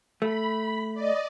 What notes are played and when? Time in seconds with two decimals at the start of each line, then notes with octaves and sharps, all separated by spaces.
0.22 A3 B5
0.94 D5 D#5